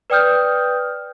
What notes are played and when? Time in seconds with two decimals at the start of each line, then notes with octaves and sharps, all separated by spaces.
0.10 B4 D5 G5 D#6 F6 G6